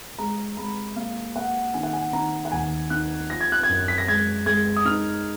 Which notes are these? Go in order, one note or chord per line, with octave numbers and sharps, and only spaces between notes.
G#3 A#5
G#3 B5
A#3 F5
A#3 F#5
D#3 G#5
F#5
G#5
D#3 A#5
F#5
D#2 G#5
D#4 F#6
F3 A#6
G#6
F#6
G#6
F#2
B6
A#6
G#3 G#6
G#3 G#6
D#6
D#4 F6